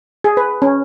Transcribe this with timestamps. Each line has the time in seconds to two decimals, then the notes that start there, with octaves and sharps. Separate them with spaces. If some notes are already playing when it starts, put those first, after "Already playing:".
0.24 G#4
0.37 B4
0.62 C#4